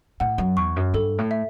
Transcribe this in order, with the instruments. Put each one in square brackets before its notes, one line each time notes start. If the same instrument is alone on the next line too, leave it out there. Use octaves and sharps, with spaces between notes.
[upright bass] A2 [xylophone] F#5
[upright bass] F#2
[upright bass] E2 [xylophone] C#6
[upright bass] F#2
[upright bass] G2 [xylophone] A4
[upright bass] A2
[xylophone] E5